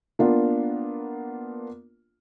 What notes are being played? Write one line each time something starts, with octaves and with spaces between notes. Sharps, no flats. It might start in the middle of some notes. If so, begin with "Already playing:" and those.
A#3 B3 D4 F4